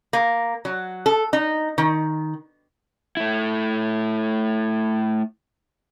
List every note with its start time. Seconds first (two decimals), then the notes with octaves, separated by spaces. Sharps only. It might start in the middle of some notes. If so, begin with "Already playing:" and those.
0.13 A#3
0.65 F#3
1.06 A4
1.33 D#4
1.78 D#3
3.17 A3 E4